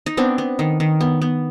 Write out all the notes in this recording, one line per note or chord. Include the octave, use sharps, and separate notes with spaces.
D#4
B3 C4 D4
B3
D#3
D#3
B3
B3